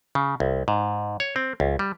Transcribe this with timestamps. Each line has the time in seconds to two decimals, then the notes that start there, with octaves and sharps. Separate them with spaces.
0.15 C#3
0.40 C2
0.68 G#2
1.20 C#5
1.36 C4
1.60 C#2
1.79 G3